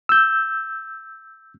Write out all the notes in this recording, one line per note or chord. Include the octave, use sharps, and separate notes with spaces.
E6 G6